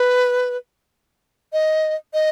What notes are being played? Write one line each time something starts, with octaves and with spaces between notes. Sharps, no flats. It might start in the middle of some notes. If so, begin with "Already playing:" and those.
Already playing: B4
D#5
D#5